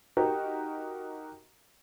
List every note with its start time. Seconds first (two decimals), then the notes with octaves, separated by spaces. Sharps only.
0.17 D#4 F#4 G4 A#4